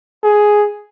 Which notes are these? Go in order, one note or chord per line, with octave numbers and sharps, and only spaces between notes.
G#4